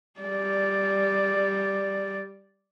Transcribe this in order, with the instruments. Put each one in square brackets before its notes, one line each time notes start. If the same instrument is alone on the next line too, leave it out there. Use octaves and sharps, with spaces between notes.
[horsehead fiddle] G3 D5